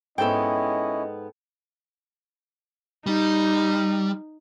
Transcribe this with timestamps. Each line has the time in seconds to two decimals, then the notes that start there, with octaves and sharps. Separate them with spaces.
0.18 G#2 B3 C#4 E4 A4 D#5 G5
3.07 G3 D#4